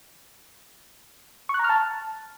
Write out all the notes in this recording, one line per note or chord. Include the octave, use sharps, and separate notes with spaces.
C#6
F#6
A#5
F6
A5